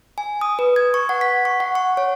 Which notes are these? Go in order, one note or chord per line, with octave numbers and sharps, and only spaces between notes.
G#5
D#6
B4
G#6
C#6
F#5
B6
C#6
F#5
C#6
C#5